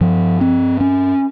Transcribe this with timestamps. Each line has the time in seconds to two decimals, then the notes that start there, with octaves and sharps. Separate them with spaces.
0.01 G2 F3
0.41 C4
0.80 C#4